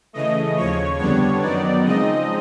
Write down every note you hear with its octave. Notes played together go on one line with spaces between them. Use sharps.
C#3 E3 A3 D#5
D#2 C#3 F3 C#5
F2 D3 G3 B3 D4 C#5
F#2 D#3 F#3 B3 D#4 D5
C#3 F3 G#3 C4 D#4 D#5